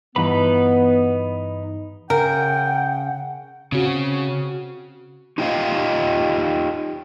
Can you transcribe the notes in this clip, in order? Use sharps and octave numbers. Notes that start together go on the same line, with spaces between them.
G2 E3 B3 D#4 B4 B5
C#7 D7
C#3 A#4 F#5 G5
C#3 C4 C#4 F#4
D#4 F4 G4 C#5 D#5 F5